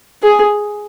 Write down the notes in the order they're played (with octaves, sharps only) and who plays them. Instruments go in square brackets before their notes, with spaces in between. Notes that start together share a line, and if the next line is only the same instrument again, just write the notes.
[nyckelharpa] G#4